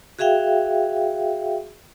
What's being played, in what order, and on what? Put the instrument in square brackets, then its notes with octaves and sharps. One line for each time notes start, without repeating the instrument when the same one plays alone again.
[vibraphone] F#4 G#4 E5 F5 G5